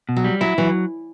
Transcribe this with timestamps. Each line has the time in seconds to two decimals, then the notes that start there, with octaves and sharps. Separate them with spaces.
0.09 B2
0.16 F#3
0.24 G3
0.41 F#3 E4
0.58 E3 F#3